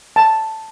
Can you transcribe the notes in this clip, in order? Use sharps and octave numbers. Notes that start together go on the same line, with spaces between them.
A5